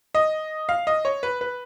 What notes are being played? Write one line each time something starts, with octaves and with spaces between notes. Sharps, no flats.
D#5
F5
D#5
C#5
B4
B4